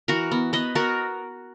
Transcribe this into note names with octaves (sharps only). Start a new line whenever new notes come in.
E3 F#4 A#4
B3
B3 B4 D#5
B3 F#4 A#4